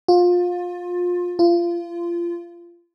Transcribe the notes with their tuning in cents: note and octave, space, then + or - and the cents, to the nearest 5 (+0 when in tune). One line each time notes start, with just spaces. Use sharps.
F4 +25
F4 -25